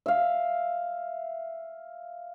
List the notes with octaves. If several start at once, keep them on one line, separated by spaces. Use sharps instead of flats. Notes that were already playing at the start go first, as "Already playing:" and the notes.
E5 F5